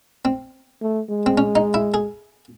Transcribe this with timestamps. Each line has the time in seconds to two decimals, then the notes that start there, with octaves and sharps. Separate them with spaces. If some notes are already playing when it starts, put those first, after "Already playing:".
0.25 C4
0.81 A3
1.09 G#3
1.26 C4
1.38 C#4
1.55 D#4
1.74 E4
1.94 G#4